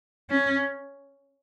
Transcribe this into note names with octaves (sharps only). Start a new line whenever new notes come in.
C#4